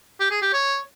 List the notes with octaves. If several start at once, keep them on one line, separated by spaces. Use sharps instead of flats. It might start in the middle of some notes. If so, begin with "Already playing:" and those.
G4
G#4
G4
C#5